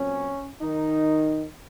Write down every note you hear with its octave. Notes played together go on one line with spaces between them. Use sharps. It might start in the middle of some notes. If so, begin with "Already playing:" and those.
Already playing: A#2 F#3 C4 C#4
D#3 D#4